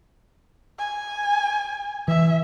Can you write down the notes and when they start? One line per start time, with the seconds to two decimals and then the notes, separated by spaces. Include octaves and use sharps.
0.78 G#5
2.08 E3 E5